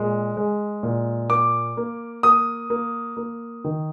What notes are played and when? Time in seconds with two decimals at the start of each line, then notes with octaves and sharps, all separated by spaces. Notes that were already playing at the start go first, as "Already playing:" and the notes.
Already playing: A#2 G#3
0.37 G#3
0.83 A#2
1.29 A#3 D6
1.77 A#3
2.23 A#3 D#6
2.70 A#3
3.17 A#3
3.64 D#3